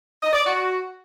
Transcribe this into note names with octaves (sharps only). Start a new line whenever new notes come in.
D#5
D5
F#4